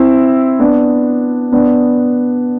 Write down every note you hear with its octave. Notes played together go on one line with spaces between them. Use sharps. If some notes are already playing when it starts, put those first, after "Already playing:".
Already playing: C4 E4
B3 D4
B3 D4